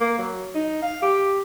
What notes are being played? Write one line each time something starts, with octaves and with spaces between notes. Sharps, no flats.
A#3
F#3
D#4
F5
G4